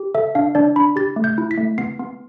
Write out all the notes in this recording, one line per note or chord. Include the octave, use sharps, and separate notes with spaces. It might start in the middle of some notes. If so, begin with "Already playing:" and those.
Already playing: G4
A4 E5
D4 F5
D4 D5
D4 B5
G4 A6
A3
G6
E4
B6
A3
B3 C7
B3